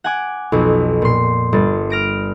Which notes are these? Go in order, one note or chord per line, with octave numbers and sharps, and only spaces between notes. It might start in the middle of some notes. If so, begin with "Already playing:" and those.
F#5 G#5 D6
B1 F2
A#2 C6
G1 A6
F6 A#6 D7